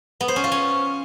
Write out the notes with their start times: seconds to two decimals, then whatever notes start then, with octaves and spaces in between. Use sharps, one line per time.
0.21 B3
0.28 C5
0.36 C#4
0.44 F4
0.52 C#4